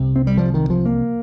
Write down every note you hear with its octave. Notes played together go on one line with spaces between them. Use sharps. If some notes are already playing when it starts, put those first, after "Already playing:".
Already playing: C2 C3
C4
G3
F3
D#3
F3
A#3